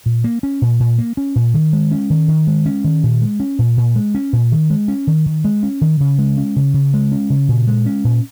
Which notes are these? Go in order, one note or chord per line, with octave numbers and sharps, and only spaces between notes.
A#2
A#3
C#4
A#2
A#2
A#3
C#4
A#2
D#3
G#3
C#4
D#3
D#3
G#3
C#4
D#3
A#2
G#3
C#4
A#2
A#2
G#3
C#4
A#2
D#3
G#3
C#4
D#3
D#3
G#3
C#4
D#3
C#3
G#3
C#4
C#3
C#3
G#3
C#4
C#3
A#2
G#3
C#4
A#2